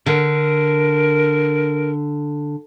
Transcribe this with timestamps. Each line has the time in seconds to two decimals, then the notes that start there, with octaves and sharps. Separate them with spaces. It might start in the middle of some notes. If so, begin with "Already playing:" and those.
0.06 D3 A#4